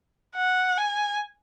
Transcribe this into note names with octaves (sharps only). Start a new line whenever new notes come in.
F#5
G#5